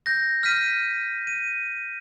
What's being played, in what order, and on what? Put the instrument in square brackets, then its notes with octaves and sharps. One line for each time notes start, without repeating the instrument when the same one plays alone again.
[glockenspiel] G6 A#6
F6 G6 B6 D#7
D#7